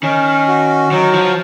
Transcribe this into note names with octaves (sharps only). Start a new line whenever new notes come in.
D#3 C#4
F#4
D#3 F#3
F3